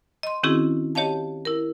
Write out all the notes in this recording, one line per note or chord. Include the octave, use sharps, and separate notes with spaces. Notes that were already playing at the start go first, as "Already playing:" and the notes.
D#5 C6
D#3 C4 C#4 E4 F#4 G#4
G4 C#5 D#5 F5 A5
E4 A#4